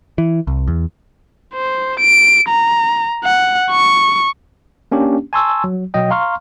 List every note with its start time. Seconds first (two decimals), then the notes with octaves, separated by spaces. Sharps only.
0.18 E3
0.47 C2
0.68 E2
1.54 C5
2.00 D7
2.49 A#5
3.25 F#5
3.71 C#6
4.92 A#3 C#4 D4 G4
5.33 G#5 A5 C6 C#6 E6
5.64 F#3
5.94 B2 F#3 D#5 G5
6.10 F5 A#5 C6 C#6 F6